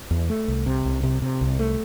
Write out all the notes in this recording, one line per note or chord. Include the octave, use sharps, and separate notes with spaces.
E2
A3
C2
C3
C2
C3
C3
C2
A3